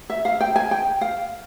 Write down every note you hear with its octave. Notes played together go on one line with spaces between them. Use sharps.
E5
F5
G5
G#5
G5
F5